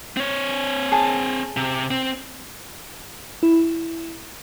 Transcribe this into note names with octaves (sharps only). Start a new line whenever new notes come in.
C4 C#5
G#4 A5
C3
C4
E4